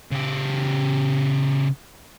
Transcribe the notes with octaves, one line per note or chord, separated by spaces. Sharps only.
C#3 G4